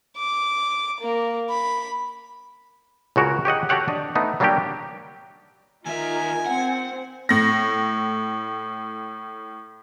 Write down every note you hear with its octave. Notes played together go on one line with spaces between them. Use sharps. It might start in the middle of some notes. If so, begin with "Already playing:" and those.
D6
A#3
B5
C#2 C#3 F#4 A#4 C#5
G4 C#5 D#5 F#5
F#4 G4 A4 C#5 F#5 G5
D4 D#5
A3 B3 D#4
F#3 G3 A#3 D4 F#4 G4
D#2 D#4 F4 A#4 E5 G#5
C4 F#5
A2 A#6